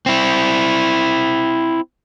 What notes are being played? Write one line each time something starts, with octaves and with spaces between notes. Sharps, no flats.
C4 E4